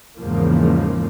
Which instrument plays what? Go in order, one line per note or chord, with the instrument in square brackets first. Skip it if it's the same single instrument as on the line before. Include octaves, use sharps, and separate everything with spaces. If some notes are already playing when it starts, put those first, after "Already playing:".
[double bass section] E2 G#2 C#3 F3 A#3